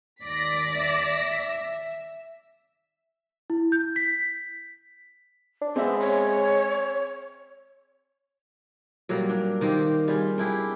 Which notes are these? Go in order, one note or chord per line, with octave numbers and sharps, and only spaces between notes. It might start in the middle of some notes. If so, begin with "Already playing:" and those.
D#2 D5 A#6 B6
E5
E4
G6
B6
D4
G#3 B3 C4 E5
C#5
A#2 F#3 G3 A#3
D4
D#3 A#3 C4 G4
G3 F4 G#4
D4 E4 G4 G#4